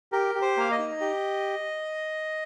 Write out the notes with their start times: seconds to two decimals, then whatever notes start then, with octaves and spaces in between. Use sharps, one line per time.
0.12 G4 A#4
0.35 G4
0.42 C5
0.57 A#3 F5
0.72 D#5
0.78 D#4
1.01 G4